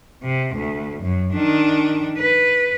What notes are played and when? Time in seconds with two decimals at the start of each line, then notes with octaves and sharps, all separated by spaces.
0.24 C3
0.55 D2
1.03 F#2
1.34 D#3 D4
2.18 B4